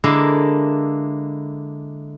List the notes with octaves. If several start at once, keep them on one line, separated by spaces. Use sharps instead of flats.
D3 G#3 A#3 E4 A4